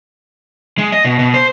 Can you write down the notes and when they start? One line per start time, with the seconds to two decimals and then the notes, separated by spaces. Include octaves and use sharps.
0.78 G#3
0.92 D#5
1.05 B2
1.19 B2
1.34 C5